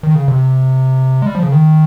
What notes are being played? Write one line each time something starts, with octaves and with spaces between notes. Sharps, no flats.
D#3
C#3
C3
G#3
G3
F3
C#3
D#3